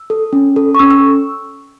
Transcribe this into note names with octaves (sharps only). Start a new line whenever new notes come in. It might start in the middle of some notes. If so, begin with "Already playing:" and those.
Already playing: E6
A4
C#4
A4
C#6
C#4 E6
E6